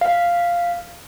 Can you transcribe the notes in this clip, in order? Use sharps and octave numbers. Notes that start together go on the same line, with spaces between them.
F5